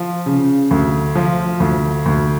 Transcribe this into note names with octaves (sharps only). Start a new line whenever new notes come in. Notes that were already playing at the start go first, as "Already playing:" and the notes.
Already playing: F3
C#3
D2
F3
D2
D2